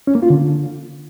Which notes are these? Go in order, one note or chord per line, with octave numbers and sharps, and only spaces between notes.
C#4
A#3
F4
D3